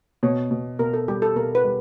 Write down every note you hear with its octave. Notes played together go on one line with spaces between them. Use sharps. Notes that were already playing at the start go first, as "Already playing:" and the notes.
B2 C#5
B2
B2 A#4
A4
G3 G4
A4
B2 A#4
B4
G3